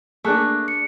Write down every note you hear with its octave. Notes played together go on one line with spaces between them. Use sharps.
A3 A#3 D4 G#4 C#6 F#6
C#7